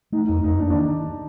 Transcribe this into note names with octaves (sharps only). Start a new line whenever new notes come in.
A3 D#4
F2 D#4
F2 D#4
A#3 D4
D4
D#3